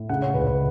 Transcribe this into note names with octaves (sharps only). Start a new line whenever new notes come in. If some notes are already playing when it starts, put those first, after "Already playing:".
Already playing: A2
C#3 F#5
C#5
C#2 B4
B4